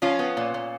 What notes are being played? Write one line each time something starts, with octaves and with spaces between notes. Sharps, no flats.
F3 C#4 F4
B3
A#2
A#2